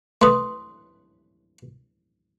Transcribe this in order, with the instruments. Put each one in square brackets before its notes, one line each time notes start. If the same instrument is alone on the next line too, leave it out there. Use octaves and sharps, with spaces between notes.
[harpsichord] A3 B4 [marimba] C6 D#6